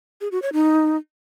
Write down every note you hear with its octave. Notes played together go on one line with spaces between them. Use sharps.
G#4
F#4
C#5
D#4